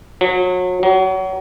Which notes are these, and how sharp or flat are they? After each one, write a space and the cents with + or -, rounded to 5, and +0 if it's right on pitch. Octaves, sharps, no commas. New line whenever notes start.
F#3 -30
F#3 +30